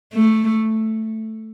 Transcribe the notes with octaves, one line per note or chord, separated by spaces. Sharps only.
A3